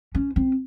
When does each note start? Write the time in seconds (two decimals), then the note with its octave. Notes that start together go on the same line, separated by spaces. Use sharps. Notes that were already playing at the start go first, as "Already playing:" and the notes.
0.15 C#4
0.36 C4